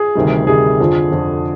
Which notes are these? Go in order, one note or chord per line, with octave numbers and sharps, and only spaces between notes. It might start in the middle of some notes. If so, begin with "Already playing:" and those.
Already playing: G#4
D2 C3 D#3 G3
D2 C3 D#3 G3 G#4
F2 D3 F3
F2 D3 F3